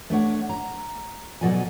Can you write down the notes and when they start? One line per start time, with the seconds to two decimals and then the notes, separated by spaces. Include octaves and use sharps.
0.10 A3 D4 C#5 F#5
0.49 A#5
1.41 B2 F#3 A4 D5 D#5 G#5